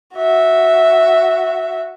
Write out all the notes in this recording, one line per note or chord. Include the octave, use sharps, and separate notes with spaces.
F#4 E5